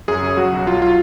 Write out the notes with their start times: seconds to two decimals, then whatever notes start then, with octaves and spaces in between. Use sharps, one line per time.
0.08 F#2 G#4
0.23 C#3
0.37 F#3 F#4
0.52 B1
0.67 F#3 F4
0.82 F4